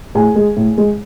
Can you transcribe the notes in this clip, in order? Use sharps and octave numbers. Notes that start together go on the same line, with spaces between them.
A2 G#4 G#5
G#3
A2
G#3